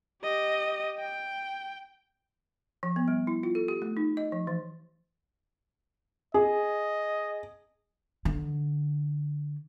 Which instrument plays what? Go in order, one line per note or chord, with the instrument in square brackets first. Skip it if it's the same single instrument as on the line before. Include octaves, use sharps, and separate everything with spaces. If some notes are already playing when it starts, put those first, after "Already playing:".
[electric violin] G4 D#5
G5
[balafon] F3
B3
G3
E4
F4
A4
G4
A3
D#4
D#5
F3
E3
[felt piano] G#4 [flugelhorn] D#5
[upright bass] D3